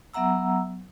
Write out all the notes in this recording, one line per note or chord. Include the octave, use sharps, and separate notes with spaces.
F#3 B3 E5 F#5 A#5 E6